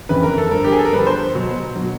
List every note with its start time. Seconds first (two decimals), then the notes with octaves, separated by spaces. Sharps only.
0.09 F2 C#3 E3 B4
0.23 A#4
0.38 A4
0.51 G2 D3 F3 A#4
0.64 G4
0.72 G#4
0.79 A4
0.85 A#4
0.93 G2 D3 F3 B4
1.06 C5
1.35 B2 F#3
1.76 B2 F#3